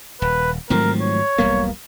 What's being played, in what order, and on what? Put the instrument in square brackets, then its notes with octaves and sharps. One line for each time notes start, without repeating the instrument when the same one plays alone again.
[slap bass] D#1 [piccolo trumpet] B4
[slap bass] G#2 D#3 F3 [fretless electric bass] F#3 A3 C4 [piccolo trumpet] A#4
[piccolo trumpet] C#5
[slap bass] E1 G3 B3 [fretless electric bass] B1 A#3